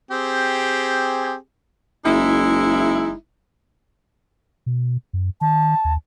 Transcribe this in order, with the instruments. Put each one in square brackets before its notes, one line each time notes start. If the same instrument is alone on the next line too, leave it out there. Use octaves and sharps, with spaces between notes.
[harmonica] C4 G4 G#4
[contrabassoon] F#1 [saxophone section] G#3 D#4 E4
[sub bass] B2
F#2
[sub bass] D#3 [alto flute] A5
[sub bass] D#2